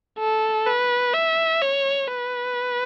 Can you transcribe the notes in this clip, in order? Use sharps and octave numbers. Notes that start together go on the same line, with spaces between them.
A4
B4
E5
C#5
B4